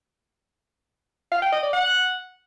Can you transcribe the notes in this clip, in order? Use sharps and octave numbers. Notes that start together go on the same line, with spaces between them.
F5
G5
D#5
D5
F#5